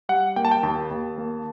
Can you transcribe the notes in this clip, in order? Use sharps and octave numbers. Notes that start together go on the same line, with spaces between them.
G3 F#5
A#3 G5
A5
G5
D#2 A5
D#2
A#3